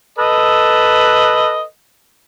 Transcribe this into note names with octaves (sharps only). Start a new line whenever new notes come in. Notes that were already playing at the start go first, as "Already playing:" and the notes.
A4 B4 D#5